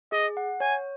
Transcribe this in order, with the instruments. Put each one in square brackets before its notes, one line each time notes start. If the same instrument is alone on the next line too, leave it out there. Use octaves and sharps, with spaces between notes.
[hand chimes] G#4 [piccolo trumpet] D#5
[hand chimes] F#5
[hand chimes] C#5 [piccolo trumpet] G#5